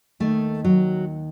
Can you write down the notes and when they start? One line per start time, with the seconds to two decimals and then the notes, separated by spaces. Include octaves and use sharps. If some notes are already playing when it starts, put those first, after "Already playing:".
0.20 D#2 D#3 A3
0.64 F#3